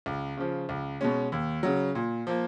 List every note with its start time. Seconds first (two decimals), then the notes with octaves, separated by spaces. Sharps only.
0.06 C#2
0.37 C#3 F3
0.69 C#2
1.01 B2 G#3 C#4
1.32 D#2
1.63 C#3 F#3
1.95 A#2
2.27 F3 A#3